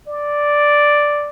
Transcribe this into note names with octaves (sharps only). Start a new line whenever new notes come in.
D5